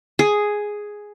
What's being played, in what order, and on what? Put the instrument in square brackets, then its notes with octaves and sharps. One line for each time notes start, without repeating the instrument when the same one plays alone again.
[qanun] G#4